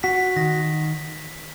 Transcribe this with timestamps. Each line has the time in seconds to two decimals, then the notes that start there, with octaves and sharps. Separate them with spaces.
0.03 F#4 B6
0.36 D#3 A#6